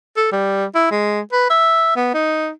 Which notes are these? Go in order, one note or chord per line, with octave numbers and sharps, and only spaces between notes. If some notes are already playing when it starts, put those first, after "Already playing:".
A4
G3
E4
G#3
B4
E5
B3
D#4